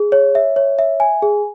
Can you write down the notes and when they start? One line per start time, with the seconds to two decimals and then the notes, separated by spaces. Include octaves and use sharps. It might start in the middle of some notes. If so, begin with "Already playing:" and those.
Already playing: G#4
0.12 C#5
0.35 E5
0.56 C#5
0.79 E5
1.00 G#5
1.22 G#4